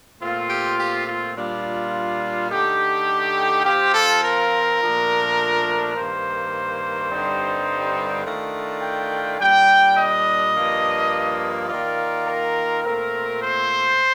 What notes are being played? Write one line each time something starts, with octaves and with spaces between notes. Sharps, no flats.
A#2 A3 C4 F4
G4
G4
F4
A#2 G3 D4 F4
D3 A3 D#4 G4
F3 C4 F4 G4
A4
A#4
A#2 F3 A3 D4
G2 D#3 A#3 C5
G2 D3 G3 C4 D#4
D#3 A3 D4 F4
G5
A#2 G3 D4 G5
D#5
G2 F3 A#3 D4
D#3 A#3 F4 D5
A#4
A#2 A3 C4 F4 A#4
C5